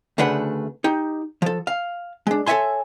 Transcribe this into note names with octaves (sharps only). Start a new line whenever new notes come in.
D2 C#3 A3 D4 B4 F#5
D#4 G4
F3 A4
F5
G#3 D4
A4 C#5 D#5 E5 G#5 C6